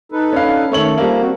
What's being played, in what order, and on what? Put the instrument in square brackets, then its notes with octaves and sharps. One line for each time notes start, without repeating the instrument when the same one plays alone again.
[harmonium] D#4 A4 B4
[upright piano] C#4 D4 F5
[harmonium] D#3 A3 A4 [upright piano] C#4 C#5 F#7
[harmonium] F3 [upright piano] G3 A#3
[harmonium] C4 F#4